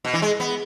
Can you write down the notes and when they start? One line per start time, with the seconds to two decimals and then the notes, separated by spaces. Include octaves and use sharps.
0.05 B2
0.14 E3
0.22 G#3
0.40 B3